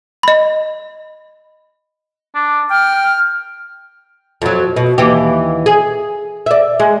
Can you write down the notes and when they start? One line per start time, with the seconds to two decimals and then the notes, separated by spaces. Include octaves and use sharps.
0.23 D#5 B5
2.35 D4
2.71 G5 F6
4.42 F2 F#3
4.76 B2
4.98 D#2 E3 G4
5.66 G#4
6.46 D5 E5
6.80 G#3